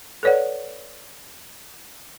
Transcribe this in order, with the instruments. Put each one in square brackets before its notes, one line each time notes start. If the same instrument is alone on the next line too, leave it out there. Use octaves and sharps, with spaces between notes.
[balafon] A4 B4 C#5 D5 F#5